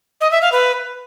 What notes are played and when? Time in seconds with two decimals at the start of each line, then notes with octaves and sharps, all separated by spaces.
0.21 D#5
0.31 E5
0.42 F5
0.52 B4